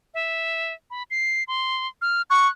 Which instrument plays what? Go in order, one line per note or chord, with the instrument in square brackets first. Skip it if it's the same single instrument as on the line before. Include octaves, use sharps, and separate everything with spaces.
[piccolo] E5
B5
C7
C6
F6
[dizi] C#6 [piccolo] F#6